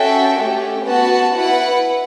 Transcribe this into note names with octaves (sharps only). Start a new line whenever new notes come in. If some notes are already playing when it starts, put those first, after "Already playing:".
Already playing: C#4 F#4 A4 E5 G5
A3 C#4 G4
B3 F#4 B4 F#5 A5
E4 B4 F#5